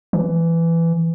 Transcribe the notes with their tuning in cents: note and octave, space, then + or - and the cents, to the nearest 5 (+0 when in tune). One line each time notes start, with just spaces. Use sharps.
E3 +15